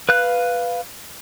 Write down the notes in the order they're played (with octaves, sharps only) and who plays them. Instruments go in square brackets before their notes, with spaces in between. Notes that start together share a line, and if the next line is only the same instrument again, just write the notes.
[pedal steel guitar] B4 F5 F#6